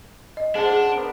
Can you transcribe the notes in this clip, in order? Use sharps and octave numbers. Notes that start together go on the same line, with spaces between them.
D#5
D4 G#4 C5 F#5 A5
G#4
B3 D4 A#4